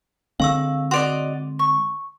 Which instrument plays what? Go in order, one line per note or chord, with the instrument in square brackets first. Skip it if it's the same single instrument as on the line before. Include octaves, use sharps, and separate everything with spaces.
[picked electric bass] D3 G#3 C4 [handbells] F5 C#6 E6
[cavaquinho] F#4 D5 D#5 [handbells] C6
[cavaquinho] C#6